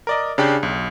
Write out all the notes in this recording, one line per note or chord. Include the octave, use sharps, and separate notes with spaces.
A#4 D5 D#5
C#3 D4 G4
B1